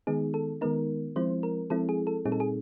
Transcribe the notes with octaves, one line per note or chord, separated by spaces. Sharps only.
D#3 G#3 B3 D#4 G#4
A4
D#3 G#3 B3 D#4 A#4
F3 G#3 C4 E4 C5
A#4
F3 G#3 C4 E4 A4
G#4
A4
A#2 G3 C4 D#4 G#4
A4
G#4